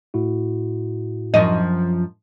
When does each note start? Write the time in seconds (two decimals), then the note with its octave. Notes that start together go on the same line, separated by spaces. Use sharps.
0.14 A2 E4 F#4
1.34 F#2 F3 D#5